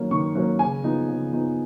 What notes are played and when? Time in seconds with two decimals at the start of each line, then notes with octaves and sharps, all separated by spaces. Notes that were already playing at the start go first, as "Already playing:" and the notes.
Already playing: D#3 F#3 A#3 C#4
0.11 D#3 C#6
0.35 F#3 A#3 C#4
0.59 C#3 G#5
0.84 F3 B3 D#4
1.08 C#3
1.33 F3 B3 D#4